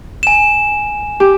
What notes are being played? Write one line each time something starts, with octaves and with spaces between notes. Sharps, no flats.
G#5 E7
G4